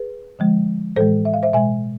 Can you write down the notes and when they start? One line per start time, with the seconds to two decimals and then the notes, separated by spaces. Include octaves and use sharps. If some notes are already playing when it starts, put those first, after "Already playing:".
Already playing: G#4 B4
0.39 D3 F3 G#3
0.96 A2 E3 G#3 A4 C5
1.25 E5
1.33 F5
1.43 C5 E5
1.53 B2 G#3 E5 G#5